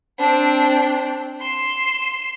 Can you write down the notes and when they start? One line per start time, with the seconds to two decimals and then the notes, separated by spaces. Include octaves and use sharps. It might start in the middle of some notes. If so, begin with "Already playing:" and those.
0.18 C4 D4
1.40 C6 E7